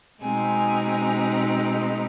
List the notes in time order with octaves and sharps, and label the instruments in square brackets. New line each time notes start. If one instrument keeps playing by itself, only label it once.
[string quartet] B2 G#3 C4 D#4 G#5